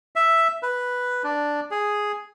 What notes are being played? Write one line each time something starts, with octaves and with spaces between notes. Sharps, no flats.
E5
B4
D4
G#4